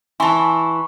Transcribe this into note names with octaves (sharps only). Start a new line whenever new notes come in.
E3 E4 G#5 A5 C6 C#6